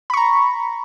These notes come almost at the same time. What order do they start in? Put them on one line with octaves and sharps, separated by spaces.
B5 C#6 A#5